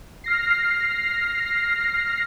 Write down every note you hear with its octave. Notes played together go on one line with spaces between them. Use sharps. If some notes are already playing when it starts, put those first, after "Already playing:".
F6 A#6 C7